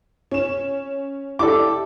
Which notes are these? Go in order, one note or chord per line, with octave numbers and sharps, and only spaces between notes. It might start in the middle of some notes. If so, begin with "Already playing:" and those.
C#4 E7
E4 G4 A4 D5 D6